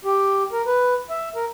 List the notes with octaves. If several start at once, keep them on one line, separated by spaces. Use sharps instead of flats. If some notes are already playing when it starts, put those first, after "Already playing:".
G4
A#4
B4
E5
A#4